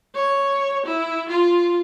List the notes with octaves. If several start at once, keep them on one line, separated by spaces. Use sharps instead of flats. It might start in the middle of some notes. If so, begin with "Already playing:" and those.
C#5
E4
F4